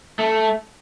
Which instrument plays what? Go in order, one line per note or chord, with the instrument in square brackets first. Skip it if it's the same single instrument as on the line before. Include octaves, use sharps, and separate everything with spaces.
[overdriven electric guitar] A3